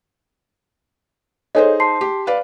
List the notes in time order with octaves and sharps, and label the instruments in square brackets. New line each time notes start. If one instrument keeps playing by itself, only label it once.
[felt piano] D#4 G#4 C5 [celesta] A4 C#5 D#5
[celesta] A5 C6 C7
[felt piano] G4
B4 D5 F5